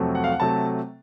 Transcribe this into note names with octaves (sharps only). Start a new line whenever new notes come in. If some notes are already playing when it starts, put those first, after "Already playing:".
Already playing: F2 C3 F#3 A3
F#5
F5
F#5
C3 F#3 A3 A5